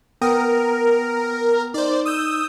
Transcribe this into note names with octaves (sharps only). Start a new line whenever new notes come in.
B3 A#4 G5 D#6
D#4 C5 D5
D#6 E6 G6